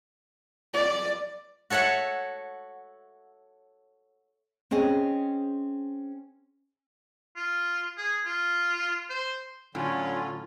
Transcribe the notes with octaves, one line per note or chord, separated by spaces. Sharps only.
D5
F#4 A4 C#5 E5 F#5
C4 C#4 G#4 D#5
F4
G#4
F4
C5
A2 D3 F#3 C#4 F4